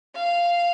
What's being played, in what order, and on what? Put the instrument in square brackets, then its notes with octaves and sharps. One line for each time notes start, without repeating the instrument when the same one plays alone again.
[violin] F5